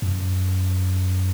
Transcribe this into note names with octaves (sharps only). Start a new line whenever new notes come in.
F#2